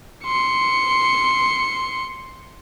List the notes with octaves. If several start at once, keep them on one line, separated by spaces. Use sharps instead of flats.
C6 C#7